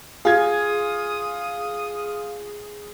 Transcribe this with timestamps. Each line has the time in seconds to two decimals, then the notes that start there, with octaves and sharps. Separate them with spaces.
0.25 F4 G#4 D#6 G#6